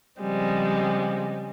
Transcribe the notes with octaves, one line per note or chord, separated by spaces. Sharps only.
C#3 F3 G3 G#3 C4